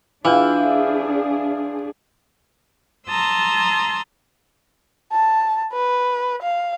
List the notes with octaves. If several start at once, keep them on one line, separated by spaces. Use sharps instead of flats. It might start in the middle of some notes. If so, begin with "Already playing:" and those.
E3 D4 E4 F4 G#4 F5 G5
A5 A#5 C6 D#6 E6
A5
B4
F5